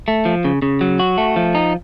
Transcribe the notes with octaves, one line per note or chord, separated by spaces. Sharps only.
A3
F3
C#3
C#3
F#3
F#4
A3
F3
D#4